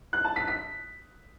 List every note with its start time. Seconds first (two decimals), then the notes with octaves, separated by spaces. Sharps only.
0.13 F#6
0.25 A5
0.36 B6
0.48 B6